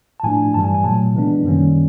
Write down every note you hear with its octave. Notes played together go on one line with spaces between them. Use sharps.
A5
A2 F3 A3 D4 G#5
G2 E3 G3 A5
G#5
G#5
A#2 F#3 A3 A5
C3 E3 G#3 B3 D4
F#2 D#3 G3 A#3 C#4